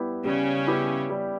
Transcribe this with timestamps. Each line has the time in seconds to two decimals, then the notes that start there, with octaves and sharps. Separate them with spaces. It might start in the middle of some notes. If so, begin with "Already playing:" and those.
Already playing: G3 B3 E4 G4
0.25 C#3 G3 C#4
0.67 B3 E4 G4
1.10 G3